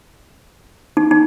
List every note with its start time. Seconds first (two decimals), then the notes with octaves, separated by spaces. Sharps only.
0.97 D#4
1.11 D#4